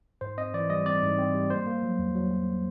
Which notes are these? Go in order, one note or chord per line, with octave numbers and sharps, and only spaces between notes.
G#2 C5
C4 D#5
E3 D5
G3 D#5
C4 D5
G#2
C4
G3
A#3 C5
A#3
F#3
E2
F#3
F#3